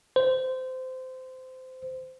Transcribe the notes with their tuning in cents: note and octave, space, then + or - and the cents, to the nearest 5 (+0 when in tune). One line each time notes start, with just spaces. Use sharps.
C5 -20